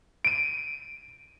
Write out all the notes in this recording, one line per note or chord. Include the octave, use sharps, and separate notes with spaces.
D7 D#7